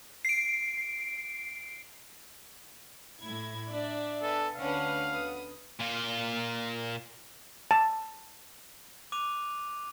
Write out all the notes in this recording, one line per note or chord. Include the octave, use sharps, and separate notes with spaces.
C7 D7
A2 E4 G#6
D4 D5 E5
B3 A4 G#5
D2 C#4 D4 B4 F5 F#5
B3 D#6
A#2 F4
A5
D6 F#6 D#7 F7